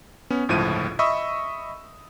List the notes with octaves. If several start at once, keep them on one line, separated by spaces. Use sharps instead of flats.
B3 C#4
G1 C#2 A2 F3 E4 D#7
D#5 E5 B5 C#6 D#6 E6